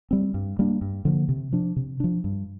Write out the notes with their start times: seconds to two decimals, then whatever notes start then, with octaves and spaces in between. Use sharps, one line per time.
0.11 G3 C4
0.34 G2
0.59 G3 A#3 D4
0.81 G2
1.05 D3 F3 A#3
1.29 C3
1.53 F3 D4
1.76 C3
2.00 F3 D4
2.24 G2